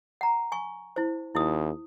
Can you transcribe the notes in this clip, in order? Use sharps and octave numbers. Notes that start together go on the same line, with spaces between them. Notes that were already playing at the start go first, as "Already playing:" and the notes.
F#5 A#5
G#5 C#6
E4 C5
D#2 E4 D#6